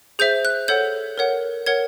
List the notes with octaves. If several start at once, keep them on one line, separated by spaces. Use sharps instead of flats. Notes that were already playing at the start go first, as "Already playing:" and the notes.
G#4 C5 E5 G6
F#6
A4 C#5 F#5 G6
A#4 C#5 F#5
A#4 C#5 F#5 G#6